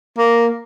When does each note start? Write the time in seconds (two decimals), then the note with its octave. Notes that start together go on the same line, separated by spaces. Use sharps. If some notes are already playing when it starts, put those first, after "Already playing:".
0.18 A#3